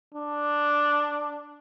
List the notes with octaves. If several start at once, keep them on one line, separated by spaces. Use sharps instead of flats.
D4